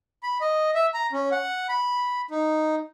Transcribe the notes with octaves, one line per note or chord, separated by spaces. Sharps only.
B5
D#5
E5
A#5
C#4
F#5
B5
D#4